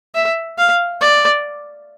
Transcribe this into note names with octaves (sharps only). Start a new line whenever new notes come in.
E5
F5
D5